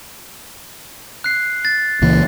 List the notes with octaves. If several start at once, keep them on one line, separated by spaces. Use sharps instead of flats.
F#6 C7
A6
C#2 A#2 E3